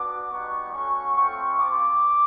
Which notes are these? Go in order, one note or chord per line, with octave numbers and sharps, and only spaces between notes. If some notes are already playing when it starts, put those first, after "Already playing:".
Already playing: B3 D4 F#4 D6
G3 B3 D#4 F#4 C#6
A3 C#4 F#4 C#6
A3 C4 F4 C#6
C4 F4 D6